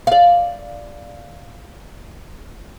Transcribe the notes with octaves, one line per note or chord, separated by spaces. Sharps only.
D5 F5